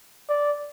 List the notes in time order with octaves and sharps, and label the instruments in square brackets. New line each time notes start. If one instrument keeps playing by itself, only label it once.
[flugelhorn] D5